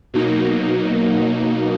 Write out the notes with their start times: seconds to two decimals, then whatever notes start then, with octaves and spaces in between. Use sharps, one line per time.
0.14 B2 F#3 A#3 D#4